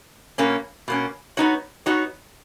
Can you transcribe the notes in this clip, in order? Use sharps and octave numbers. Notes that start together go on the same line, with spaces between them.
B2 A#3 C#4
B2 A#3 C#4
B3 D#4 F#4 C#5
B3 D#4 F#4 C#5